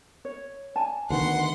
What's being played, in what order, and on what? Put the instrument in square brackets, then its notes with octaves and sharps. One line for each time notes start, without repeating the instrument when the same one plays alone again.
[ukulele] C#5
D5 G#5 A5
[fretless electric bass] D2 D#3 B3 [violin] F#5 C6